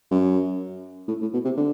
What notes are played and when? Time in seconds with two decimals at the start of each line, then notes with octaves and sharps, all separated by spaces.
0.11 F#2
1.08 A2
1.21 A2
1.33 B2
1.44 C3
1.57 D3